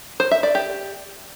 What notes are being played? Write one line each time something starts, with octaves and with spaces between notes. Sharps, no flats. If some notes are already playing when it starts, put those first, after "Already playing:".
C5
E5
D5
G4